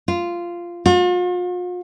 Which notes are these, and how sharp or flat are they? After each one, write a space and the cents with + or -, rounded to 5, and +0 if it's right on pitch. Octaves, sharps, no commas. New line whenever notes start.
F4 -10
F4 +45